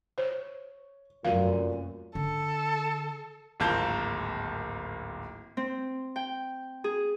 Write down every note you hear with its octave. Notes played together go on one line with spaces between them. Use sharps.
C5 C#5
F1 F#2 A#2 F#4 F5 D#7
D3 A4
D1 G#1 A#3 F4 A5 G6
C4
G5
G#4